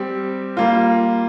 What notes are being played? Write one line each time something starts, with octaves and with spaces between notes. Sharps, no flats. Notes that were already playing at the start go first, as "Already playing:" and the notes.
Already playing: G3 C4 G4
G3 A#3 F4